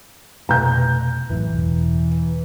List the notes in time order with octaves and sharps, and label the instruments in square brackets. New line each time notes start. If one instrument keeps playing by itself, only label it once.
[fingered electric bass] F1 B2 A3 [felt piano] A#5 G6
[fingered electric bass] A1 F#2 A2 [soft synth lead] E3
[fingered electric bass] E1